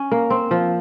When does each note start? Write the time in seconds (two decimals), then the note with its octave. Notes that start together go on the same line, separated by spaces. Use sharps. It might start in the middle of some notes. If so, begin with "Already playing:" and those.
Already playing: C#4
0.12 A#3
0.30 C4
0.51 F3